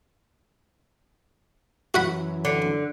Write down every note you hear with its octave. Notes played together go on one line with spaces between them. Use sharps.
F#2 E3 F#4 F#5 B5
D3